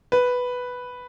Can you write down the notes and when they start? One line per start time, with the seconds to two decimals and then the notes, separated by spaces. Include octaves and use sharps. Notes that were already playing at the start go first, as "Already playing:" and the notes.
0.12 B4